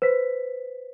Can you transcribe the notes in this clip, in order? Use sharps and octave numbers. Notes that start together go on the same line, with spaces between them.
B4 C5 B6